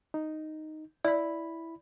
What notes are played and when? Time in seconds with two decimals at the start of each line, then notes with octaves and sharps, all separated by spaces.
0.14 D#4
1.05 E4 D5 B5